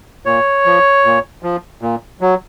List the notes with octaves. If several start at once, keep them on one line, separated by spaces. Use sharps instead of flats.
A#2 C#5
F3
A#2
F3
A#2
F#3